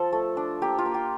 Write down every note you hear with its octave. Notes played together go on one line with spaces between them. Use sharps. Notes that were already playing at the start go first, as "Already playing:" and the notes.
Already playing: F3 A4
A3
D4
A#3 G4
F4
A#3
G4